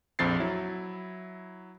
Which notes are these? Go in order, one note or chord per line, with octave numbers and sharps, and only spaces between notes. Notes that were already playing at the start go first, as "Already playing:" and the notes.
A#1 F2 C4 A6 C7
F#3 E4